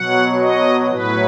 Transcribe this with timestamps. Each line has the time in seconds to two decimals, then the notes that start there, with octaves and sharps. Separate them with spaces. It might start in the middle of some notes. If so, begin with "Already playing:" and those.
Already playing: B2 F#3 F#5
0.41 D#5
0.91 A2 F#3 B4